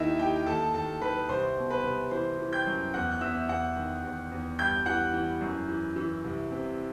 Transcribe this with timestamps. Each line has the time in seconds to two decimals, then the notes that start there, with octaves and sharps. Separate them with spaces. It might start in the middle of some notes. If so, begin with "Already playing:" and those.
Already playing: D#2 D#3 D#4 E4 D#5 E5
0.19 D#3 G4 G5
0.36 G5
0.46 D#2 A4 A5
0.74 D#2 A4 A5
1.01 D#3 B4 B5
1.29 C2 C5 C6
1.56 B2
1.70 B4 B5
1.84 C2
2.11 E3 C5 C6
2.39 E3
2.53 G5 G6
2.66 F#2
2.94 E2 F#5 F#6
3.12 F#6
3.21 E2 E5 E6
3.49 E2 F#5 F#6
3.76 D#3
4.04 E2
4.32 E2
4.58 G2 G5 G6
4.86 E3 F#5 F#6
5.13 E3
5.41 F#2
5.69 E3
5.96 E3
6.24 C2
6.51 C3